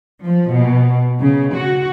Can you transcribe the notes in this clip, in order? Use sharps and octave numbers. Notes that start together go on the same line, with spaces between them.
F3
B2
C#3
F#4